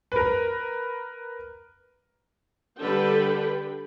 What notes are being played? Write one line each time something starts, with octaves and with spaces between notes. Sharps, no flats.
A#4 B4
D3 G3 A4 B4 G5 B5